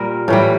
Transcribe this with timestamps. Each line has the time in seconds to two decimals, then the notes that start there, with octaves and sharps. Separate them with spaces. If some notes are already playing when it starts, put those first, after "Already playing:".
Already playing: A#2 G3 A#4
0.28 A2 E3 G3